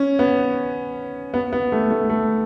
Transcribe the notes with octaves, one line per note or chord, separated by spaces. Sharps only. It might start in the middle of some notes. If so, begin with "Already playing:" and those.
Already playing: C#4
B3
B3
B3
A3
A3
A3